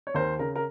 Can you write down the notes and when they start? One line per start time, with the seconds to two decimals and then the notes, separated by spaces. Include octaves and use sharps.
0.07 C#5
0.14 D#2 A#4 C5
0.39 C#3 A#4
0.56 A#4